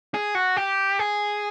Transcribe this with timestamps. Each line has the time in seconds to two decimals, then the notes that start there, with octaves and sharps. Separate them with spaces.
0.14 G#4
0.35 F#4
0.57 G4
0.99 G#4